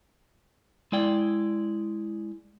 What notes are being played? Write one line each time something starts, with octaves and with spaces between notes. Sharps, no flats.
G#3 E4 D5 G5